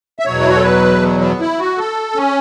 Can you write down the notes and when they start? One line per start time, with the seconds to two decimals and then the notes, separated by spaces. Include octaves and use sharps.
0.19 E5
0.26 E2 B2 F#3 C#5
0.41 E4
0.48 F#4
0.56 A4
0.64 B4
1.02 B3
1.21 B3
1.40 E4
1.59 F#4
1.78 A4
2.16 C#4